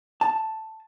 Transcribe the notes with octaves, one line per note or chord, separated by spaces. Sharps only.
A5